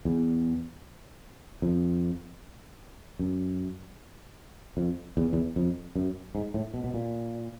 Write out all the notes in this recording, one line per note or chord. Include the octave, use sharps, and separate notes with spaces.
E2
F2
F#2
F2
E2
E2
F2
F#2
G#2
A2
B2
B2
A#2